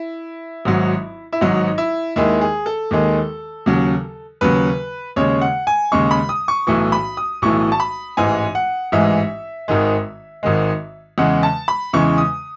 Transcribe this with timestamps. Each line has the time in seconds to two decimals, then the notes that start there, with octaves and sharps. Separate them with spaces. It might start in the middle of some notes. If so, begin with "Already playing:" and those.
Already playing: E4
0.65 G#1 G#2 F#3
1.33 E4
1.41 G#1 G#2 F#3 D#4
1.78 E4
2.16 D#2 D#3 G#3 E4
2.41 G#4
2.66 A4
2.91 D#2 D#3 G#3
3.66 D#2 C#3 F#3
4.41 D#2 C#3 F#3 B4
5.16 D#2 C#3 G#3 C#5
5.41 F#5
5.67 G#5
5.92 D#2 C#3 G#3 C#6
6.11 B5
6.29 D#6
6.48 C#6
6.67 B1 A2 E3 C#6
6.92 B5
7.17 D#6
7.42 B1 A2 E3 C#6
7.72 A5
7.80 B5
8.17 A1 G#2 E3 G#3 G#5
8.55 F#5
8.92 A1 G#2 E3 G#3 E5
9.68 G#1 G#2 D#3 G#3
10.43 G#1 G#2 D#3 G#3
11.18 E2 C#3 E3 G#3 F#5
11.43 A5
11.68 B5
11.93 E2 C#3 E3 G#3 C#6
12.18 D#6